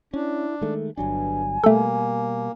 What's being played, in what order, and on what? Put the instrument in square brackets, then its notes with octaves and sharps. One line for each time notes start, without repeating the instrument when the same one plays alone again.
[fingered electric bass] C#4 [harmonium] D4 [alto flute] E4
[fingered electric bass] D#3 G#3 A3 [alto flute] A4
[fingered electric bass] G1 F#3 D4 [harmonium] G2 [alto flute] G#5
[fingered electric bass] B2 G3 [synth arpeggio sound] A3 A4 [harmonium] A#3